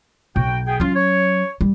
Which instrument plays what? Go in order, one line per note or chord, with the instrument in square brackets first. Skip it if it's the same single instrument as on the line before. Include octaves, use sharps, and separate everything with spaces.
[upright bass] B1 [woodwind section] F#4 G5
[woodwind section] B3 G#4 G5
[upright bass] F#3 C#4 [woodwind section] F4
[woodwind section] C#5
[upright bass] G3